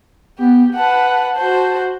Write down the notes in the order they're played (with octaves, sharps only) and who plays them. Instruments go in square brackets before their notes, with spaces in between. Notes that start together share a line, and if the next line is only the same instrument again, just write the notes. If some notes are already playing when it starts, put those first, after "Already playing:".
[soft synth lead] B3 [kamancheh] G4
[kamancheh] B4 F#5 [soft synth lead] A5
[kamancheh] F#4 C5